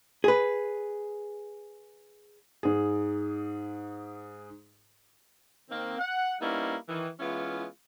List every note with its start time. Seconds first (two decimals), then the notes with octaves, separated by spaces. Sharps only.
0.24 G#4 B4
2.63 G#2 G#4
5.70 D#3 A#3 C4
5.99 F#5
6.40 G3 A#3 B3 C#4 D#4 E4
6.89 D#3 E3
7.19 E3 G#3 B3 C#4 E4 F4